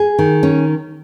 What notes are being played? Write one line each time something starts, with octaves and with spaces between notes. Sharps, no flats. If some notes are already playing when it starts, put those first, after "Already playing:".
Already playing: G#4
D#3
C#4